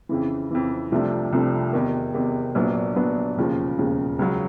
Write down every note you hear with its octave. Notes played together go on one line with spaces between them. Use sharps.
F2 C#3 E3
F2 C#3 E3
C2 C3 F3 A3 D4
C2 C3 F3 A3 D4
E2 C3 D#3
E2 C3 D#3
A#1 A#2 F#3 B3 D4
A#1 A#2 F#3 B3 D4
E1 D#2 C#3 F3
E1 D#2 C#3 F3
C#2 C#3 F#3